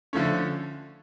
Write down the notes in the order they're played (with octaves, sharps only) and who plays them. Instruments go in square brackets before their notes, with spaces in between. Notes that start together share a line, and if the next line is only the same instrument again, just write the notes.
[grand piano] D3 F3 A3 C#4